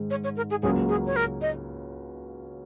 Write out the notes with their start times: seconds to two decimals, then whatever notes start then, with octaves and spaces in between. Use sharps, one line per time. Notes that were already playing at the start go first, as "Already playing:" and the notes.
Already playing: G#2 D#3 G#3
0.10 C#5
0.24 C#5
0.37 A#4
0.50 G#4
0.62 C#2 C#3 F#3 A#3 G#4
0.89 G#4
1.06 C#5
1.16 A#4
1.42 D#5